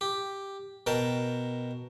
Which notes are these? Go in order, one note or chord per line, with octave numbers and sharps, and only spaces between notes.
G4
B2 A#4 G5 A5